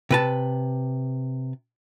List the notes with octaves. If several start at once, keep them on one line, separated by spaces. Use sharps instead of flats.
C3 B4 A5